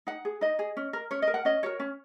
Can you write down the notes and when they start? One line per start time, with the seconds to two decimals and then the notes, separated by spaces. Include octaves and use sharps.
0.07 D#4 F#5
0.25 G#4
0.41 D#4 D#5
0.59 G#4
0.77 C#4
0.93 A#4
1.11 C#4 C#5
1.22 A#4 D#5
1.34 F#5
1.45 C#4 D#5
1.63 F#4 A#4 C#5
1.80 C#4